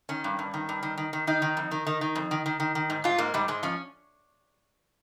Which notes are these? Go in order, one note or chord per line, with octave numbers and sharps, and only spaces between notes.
D#3 C#4
G2
G2
D#3
G2
D#3
D#3
D#3
D#3 D#4
D#3
F2
D#3
D#3
D#3
F2
D#3
D#3
D#3
D#3
G#2
G#2 F4
G#2 A#3
G#2 G3
G#2 G#3
F3 C#4